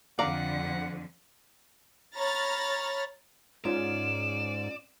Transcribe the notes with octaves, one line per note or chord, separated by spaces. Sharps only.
F2 D3 D5 F5 F#5 A#5
C#5 A#5 B5 F6 A6 A#6
G#2 C#4 F4 D5 E7